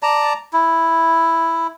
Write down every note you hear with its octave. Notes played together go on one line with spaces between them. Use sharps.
D5 A5 A#5
E4